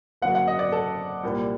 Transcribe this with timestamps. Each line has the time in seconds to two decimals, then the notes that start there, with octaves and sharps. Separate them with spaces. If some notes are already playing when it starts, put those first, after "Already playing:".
0.22 F#1 F#2 D3 F#3 A#3 F#5
0.35 F#5
0.48 D#5
0.59 D5
0.72 A4
1.23 C2 A#2 G3 A#3 D4